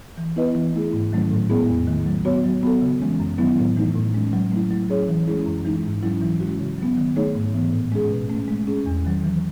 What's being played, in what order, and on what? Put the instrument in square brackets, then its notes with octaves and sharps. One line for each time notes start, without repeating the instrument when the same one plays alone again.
[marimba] E3
B3 E4 B4 D#5
E3
A3 E4 G#4
G#2
D#3 F#3 A3 C#4
A2
G#3 B3 E4 G#4
E2
D#3 A3
F#3
B3 F#4 C#5
F#3
B3 F#4 A4
C#3
E3 G#3 C#4
F#2
D#3 F#3 B3 E4
A2
E3 A3 D#4
A2
G#3 C#4
F#3
A3 E4
F#3
C#4 G#4 C#5
E3
G#3 C#4 E4 G#4
F#2
E3 G#3 D#4
G#2
F#3 C#4 E4
E3
G#3 C#4 F#4
C#3
F#3 B3
D#3
A3 D#4 G#4 C#5
G#2
E3 B3
A2
G#3 C#4 G#4
B2
A3 C#4
G#3
C#4 G#4
E2
D#3 F#3
E3